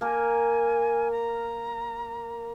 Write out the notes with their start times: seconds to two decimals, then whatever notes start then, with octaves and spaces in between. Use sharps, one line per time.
0.01 A#3 A#4 G#5
1.10 A#5